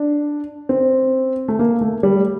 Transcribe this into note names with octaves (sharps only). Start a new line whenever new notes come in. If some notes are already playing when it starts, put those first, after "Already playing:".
Already playing: D4
C4
A3
A#3
A3
G3